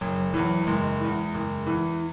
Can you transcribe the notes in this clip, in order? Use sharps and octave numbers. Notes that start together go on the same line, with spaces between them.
F#1 F#3
E2 E3 F#3
F#1 G#3
E2 E3
F#1
E2 E3